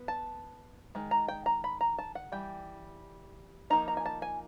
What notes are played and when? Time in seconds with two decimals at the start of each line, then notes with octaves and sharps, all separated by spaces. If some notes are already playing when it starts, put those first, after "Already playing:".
Already playing: B3
0.08 A5
0.95 D#3 G#3
1.11 A#5
1.28 G5
1.46 A#5
1.64 B5
1.81 A#5
1.98 A5
2.15 F#5
2.32 E3 G3 G5
3.70 F3 A#3 D#4 A#5
3.88 A#5
3.97 G#5
4.06 A5
4.22 G#5